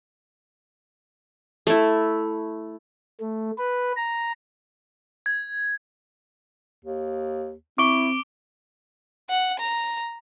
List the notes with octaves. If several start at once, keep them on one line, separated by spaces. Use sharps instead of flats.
A3 E4
A3
B4
A#5
G#6
D#2
C4 E4 C#6 D6 D7 G7
F#5
A#5